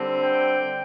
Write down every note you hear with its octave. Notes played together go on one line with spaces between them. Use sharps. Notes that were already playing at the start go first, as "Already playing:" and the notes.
Already playing: D3 G3 C4
G5